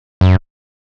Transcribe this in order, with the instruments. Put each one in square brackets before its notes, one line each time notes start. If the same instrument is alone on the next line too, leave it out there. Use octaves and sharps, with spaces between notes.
[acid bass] F#2